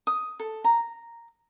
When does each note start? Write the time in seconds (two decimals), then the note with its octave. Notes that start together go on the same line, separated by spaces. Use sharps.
0.07 D#6
0.40 A4
0.64 A#5